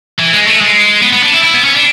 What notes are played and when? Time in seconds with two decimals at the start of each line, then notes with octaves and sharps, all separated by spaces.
0.19 E3
0.33 G#3
0.48 A3
0.61 G#3
1.02 B3
1.13 B3
1.23 D4
1.33 E4
1.44 E4
1.54 B3
1.65 C#4
1.76 D4